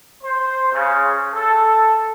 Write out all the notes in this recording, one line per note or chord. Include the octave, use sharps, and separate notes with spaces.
C5
C#3
A4